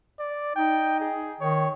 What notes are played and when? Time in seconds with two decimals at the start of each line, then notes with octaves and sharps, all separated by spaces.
0.19 D5
0.56 D#4 G5
1.00 G#4
1.41 D#3 C#5